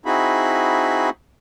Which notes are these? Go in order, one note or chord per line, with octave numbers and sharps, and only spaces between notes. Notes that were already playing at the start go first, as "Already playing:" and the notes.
C4 D#4 E4 F#4 G#4 B5